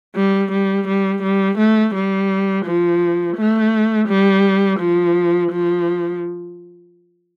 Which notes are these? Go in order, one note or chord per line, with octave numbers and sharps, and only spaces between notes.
G3
G3
G3
G3
A3
G3
F3
A3
G3
F3
F3